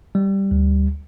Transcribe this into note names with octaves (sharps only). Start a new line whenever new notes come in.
G3
D2